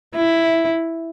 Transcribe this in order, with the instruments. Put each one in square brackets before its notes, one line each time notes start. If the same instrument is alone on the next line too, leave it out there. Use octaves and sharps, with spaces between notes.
[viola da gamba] E4